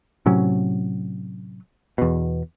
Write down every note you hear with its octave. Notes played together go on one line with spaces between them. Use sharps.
A2 C3 F#3 C#4
E2 B2